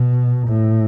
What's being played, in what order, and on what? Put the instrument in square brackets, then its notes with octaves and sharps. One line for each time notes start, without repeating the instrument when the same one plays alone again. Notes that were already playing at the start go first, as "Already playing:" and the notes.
Already playing: [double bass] B2
A2